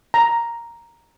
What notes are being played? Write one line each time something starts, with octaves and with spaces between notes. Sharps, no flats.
A#5